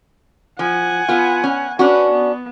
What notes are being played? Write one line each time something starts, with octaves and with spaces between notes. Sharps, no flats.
F3 F#5 G#5
B3 F4
C#4
C#4 D4 F#4 B4
B3